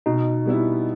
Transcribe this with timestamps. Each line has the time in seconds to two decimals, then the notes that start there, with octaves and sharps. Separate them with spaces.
0.06 B2 D#4
0.46 G3 B3 E4